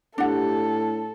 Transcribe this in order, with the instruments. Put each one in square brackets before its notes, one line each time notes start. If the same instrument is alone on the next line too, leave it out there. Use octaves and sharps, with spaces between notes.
[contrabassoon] A2 [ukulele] D4 F#5 [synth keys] G4 [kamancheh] A4